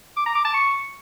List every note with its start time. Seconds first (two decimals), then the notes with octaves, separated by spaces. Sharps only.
0.17 D6
0.26 A#5
0.35 D6
0.44 A5
0.54 C#6